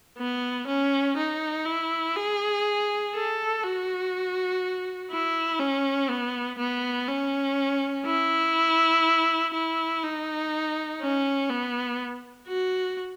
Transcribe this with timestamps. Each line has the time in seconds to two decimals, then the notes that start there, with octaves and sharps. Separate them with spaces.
0.18 B3
0.68 C#4
1.17 D#4
1.66 E4
2.16 G#4
3.15 A4
3.63 F#4
5.11 E4
5.59 C#4
6.09 B3
6.58 B3
7.08 C#4
8.06 E4
9.53 E4
10.03 D#4
11.01 C#4
11.50 B3
12.48 F#4